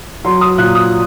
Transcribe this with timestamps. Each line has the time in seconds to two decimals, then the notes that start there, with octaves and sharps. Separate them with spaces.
0.25 F#3 C6
0.41 D#6
0.58 A#2 F#6
0.75 D#6